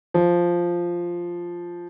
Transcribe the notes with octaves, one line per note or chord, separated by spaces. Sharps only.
F3